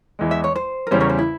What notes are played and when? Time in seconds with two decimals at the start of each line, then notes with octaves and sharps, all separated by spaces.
0.19 E2 E3 G#3
0.31 E5
0.44 C#5
0.56 C5
0.87 A#4
0.91 E2 C#3 G3 C#4 C5
1.00 A#4 C#5
1.09 C5
1.19 E4